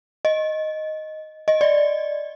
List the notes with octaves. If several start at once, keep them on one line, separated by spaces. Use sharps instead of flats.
D#5
D#5
D5